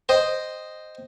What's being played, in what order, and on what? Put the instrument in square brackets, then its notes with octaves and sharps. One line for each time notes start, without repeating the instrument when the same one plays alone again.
[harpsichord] C5 D#5 G5